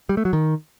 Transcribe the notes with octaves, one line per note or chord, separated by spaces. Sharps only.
G3
A3
F#3
D#3